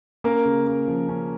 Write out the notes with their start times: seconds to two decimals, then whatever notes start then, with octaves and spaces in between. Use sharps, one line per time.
0.24 A#3 C#4 A#4
0.45 C#3
0.67 A#3
0.88 F3
1.09 C#4